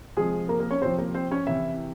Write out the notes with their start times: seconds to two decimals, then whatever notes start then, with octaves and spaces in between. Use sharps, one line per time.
0.17 C3 F3 G#3 G#4
0.49 A#3 A#4
0.60 A#3 A#4
0.71 C#4 C#5
0.82 C3 F3 C4 C5
0.98 A#3 A#4
1.14 C4 C5
1.31 C#4 C#5
1.47 C3 E3 E4 E5